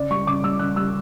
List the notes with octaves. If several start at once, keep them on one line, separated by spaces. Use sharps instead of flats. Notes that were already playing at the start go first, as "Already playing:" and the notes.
Already playing: C#3 D5
G3 C#6
C#3 D6
G3 E6
C#3 F#6
G3 E6